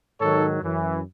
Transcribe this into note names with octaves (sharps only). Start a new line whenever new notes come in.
G#2 D#3 F#3 A4 C#5
F#2 E3